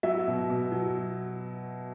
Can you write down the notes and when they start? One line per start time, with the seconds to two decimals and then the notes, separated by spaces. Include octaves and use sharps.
0.03 F#3 E5
0.27 B2
0.50 B2
0.72 F#3